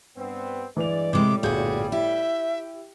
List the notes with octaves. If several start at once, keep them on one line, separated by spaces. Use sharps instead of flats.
G2 B3 C4
G2 E3 G#3 D5 F7
A2 C3 G3 G#3 D6
G1 A#2 F#4 G#4 G6
E4 G4 E5